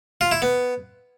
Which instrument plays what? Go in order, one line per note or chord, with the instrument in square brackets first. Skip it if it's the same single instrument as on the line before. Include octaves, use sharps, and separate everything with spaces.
[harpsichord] F4
E4
B3